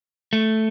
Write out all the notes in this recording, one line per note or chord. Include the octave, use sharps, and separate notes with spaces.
A3